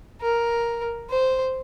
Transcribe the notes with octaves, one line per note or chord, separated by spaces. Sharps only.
A#4
C5